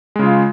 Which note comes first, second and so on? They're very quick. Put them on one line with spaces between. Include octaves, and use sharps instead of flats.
G#3 C#3 F4